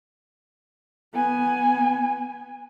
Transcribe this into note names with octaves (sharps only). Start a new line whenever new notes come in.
B3 G#5